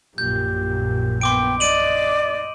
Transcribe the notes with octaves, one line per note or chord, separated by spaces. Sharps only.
A#1 F#2 A#2 G4 G6
B3 G5 C6 D6 D7
D5 D#5 D7 D#7 F#7